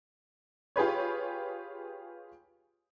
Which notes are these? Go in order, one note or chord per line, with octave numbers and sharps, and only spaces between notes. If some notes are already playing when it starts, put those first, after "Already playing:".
F4 G4 G#4 B4 C#5